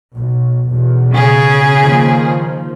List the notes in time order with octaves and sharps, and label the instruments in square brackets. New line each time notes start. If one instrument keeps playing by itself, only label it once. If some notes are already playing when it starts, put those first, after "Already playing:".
[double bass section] B1
B1 E2 B2
[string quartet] C#3 G#4
[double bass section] D#3 F3 A#3